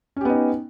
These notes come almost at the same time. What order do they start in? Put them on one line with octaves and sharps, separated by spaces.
C#4 G4 B3 D#4